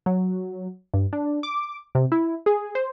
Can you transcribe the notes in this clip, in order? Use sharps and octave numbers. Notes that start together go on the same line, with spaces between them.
F#3
G2
D4
D6
C3
E4
G#4
C5